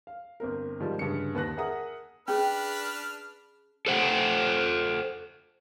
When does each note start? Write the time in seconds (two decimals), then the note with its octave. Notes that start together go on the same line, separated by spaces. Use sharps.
0.07 F5
0.40 G1 C4 A#4
0.80 G#2 D#3 F3 G3
0.99 D2 G2 C#3 C#7
1.35 D#2 B4 A5 F#6 A#6
1.57 G#4 A#4 E5 F#5 A#5 D#6
2.28 C#4 D4 G#4 B4 G5 F6
3.87 A4 C5 F#5 G5